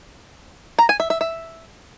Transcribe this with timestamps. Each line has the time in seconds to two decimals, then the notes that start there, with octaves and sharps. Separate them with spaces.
0.79 A#5
0.89 G#5
1.00 E5
1.10 E5
1.21 E5